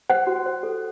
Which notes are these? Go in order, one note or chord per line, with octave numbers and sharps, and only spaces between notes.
C5 F#5
F#4
C5
A4